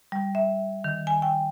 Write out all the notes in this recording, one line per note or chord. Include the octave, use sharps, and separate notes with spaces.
G3
E5
D#3
G#5
G5